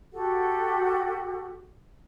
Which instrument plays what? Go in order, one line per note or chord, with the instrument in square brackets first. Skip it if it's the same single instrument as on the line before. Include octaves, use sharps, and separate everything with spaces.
[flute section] F#4 G4 A4 F#5